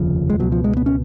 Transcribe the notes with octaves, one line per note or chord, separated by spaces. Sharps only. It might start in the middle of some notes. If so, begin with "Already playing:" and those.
Already playing: F1 D#2 C#3 F3
G#3
C#2 B2 F#3
F3
G#3
B3
C#4